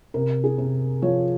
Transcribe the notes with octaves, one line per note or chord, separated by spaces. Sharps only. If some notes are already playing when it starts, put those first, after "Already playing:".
C3 A#4
G#4
C3
F3 C#5